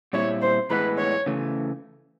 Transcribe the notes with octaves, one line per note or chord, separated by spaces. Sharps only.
A#2 G3 C4 E4 C#5
C5
A2 E3 G#3 B3 B4
C#5
C#3 E3 A3